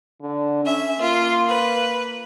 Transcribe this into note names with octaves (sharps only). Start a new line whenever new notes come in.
D3
C#4 E5
A#3 F4
B4